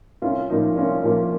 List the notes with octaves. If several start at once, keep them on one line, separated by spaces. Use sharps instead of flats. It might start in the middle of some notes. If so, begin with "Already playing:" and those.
C2 C#4 F4
A#2 F3 A#3 D#4
C2 C#4 F4
A#2 F3 A#3